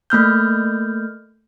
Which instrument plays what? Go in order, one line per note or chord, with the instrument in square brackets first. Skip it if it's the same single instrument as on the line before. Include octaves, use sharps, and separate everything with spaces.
[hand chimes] A3 A#3 F6 G6